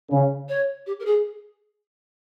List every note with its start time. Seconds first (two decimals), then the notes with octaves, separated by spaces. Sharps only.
0.11 C#3
0.49 C#5
0.87 G4
1.00 A#4
1.06 G#4